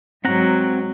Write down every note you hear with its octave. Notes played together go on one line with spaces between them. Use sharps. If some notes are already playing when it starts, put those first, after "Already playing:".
G#2 F#3 C4 F#5 A#5